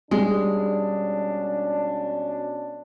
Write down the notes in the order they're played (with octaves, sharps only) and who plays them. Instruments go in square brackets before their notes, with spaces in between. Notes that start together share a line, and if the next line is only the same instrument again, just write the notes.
[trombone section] B2 C#4 D4 [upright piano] G3 [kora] G#3